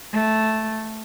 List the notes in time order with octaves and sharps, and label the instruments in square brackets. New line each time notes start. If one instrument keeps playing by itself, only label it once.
[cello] A3